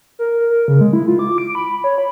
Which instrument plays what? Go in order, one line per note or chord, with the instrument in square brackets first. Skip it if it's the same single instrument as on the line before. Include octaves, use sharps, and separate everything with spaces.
[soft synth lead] A#4
A#4
C#3
G#3
E4
F4
D6
D7
B5
C#5
B5